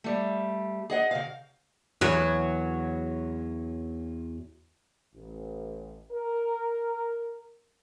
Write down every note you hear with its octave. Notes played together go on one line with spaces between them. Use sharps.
G3 A3
G#4 D#5 F#5
C#3 F5
E2 F#3
A1
A#4